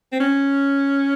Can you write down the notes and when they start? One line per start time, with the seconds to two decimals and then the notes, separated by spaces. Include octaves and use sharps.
0.12 C4
0.20 C#4